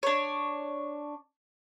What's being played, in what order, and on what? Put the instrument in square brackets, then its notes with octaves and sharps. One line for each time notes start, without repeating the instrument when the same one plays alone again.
[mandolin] D4 C#5